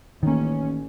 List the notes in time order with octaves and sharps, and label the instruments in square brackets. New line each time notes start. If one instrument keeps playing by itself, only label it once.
[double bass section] A1 C#4 [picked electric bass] D#3 A#3